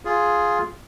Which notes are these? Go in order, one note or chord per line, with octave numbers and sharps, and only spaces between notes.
F4 G#4